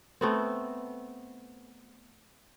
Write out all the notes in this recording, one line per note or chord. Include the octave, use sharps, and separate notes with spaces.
A3 B3 C4